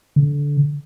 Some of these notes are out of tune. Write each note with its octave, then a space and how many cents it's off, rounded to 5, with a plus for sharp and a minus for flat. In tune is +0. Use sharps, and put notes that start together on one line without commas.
D3 -20